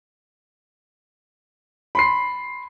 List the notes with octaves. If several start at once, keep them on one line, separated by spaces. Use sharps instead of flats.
B5 C6 C7